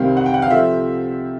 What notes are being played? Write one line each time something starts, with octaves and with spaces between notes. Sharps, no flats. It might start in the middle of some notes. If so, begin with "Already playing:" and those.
Already playing: C2 C3 D#3 G3 C4 F5
F#5
G5
F#5
F5
C3 F3 A3 C4 E5